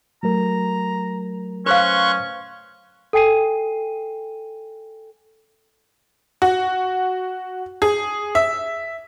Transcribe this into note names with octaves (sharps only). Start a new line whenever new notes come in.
F#3 A3 A#4 A#5
C#4 B4 C5 F5 C6 C#6 F#6
A4 G5 G#5 C7 D#7
F#4
G#4
E5